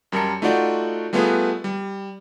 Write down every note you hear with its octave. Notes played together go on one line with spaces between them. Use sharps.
F#2 G3 A#4 A5 A#5 C#7
A3 D#4 F4 F#4 D5 F#5
G3 A3 B3 F4 G#4 B4
G3